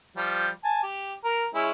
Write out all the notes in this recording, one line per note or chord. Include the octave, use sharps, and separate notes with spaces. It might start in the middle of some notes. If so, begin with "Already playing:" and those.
F3 G3
G#5 A5
G4
A#4
G#3 C#4 E4